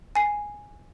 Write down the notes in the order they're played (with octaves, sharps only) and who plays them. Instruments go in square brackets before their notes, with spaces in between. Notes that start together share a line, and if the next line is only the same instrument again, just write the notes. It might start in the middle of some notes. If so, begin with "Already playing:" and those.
[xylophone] G#5 C7